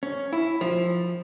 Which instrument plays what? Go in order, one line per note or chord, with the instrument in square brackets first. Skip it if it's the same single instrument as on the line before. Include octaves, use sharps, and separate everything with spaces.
[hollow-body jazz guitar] C#4
E4
F3